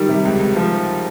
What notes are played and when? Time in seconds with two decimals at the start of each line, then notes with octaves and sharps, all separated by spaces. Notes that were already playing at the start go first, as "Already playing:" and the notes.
Already playing: D#3 G3
0.09 C3
0.25 C#2
0.40 C#2
0.56 F3